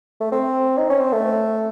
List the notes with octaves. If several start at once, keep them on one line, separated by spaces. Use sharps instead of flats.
A3
C4
D#4
C#4
C4
A3